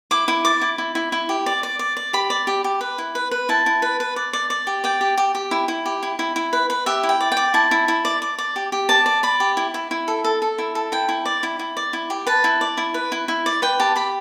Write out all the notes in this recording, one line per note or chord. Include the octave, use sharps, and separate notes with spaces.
E4 D6
E4
D5 D6
E4
E4
E4
E4
G4
D5
D5
D5
D5
G4 B5
D5
G4
G4
B4
E4
B4
B4
E4 A5
E4
B4
B4
D5
D5
D5
G4
D5 G5
G4
G4
G4
E4
E4
G4
E4
E4
E4
B4
B4
G4 E5
E4
G5
D5
G5
D5
E4 A5
E4
E4
D5
D5
D5
G4
G4
D5 A5
D5
D5 B5
G4
E4
E4
E4
A4
A4
A4
E4
A4
E4 G5
E4
D5
E4
E4
D5
E4
G4
B4 A5
E4
D5
E4
B4
E4
E4
D5
B4 G5
G4 A5
G4 B5